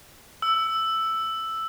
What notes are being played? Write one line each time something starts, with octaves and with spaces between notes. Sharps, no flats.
E6